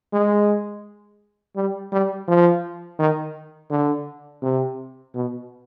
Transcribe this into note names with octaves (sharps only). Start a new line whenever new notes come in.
G#3
G3
G3
F3
D#3
D3
C3
B2